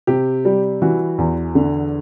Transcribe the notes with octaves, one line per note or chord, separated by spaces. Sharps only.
C3 G4
G3
E3 F#4
E2
D3